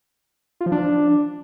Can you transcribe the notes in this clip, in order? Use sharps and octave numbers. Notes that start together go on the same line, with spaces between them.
F4
F3
D4